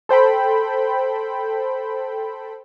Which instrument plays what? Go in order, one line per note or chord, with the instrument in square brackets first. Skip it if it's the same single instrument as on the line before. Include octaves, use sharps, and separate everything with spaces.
[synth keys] A4 C5 G5 B5